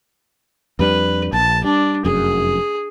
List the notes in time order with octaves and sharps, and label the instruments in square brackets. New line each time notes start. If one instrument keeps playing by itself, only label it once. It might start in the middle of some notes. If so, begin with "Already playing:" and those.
[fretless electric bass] F2 G3 D4 [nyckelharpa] B4
[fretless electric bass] A#1 [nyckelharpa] A5
[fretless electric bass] G3 [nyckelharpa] D4
[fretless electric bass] F1 F#2 [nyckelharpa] G#4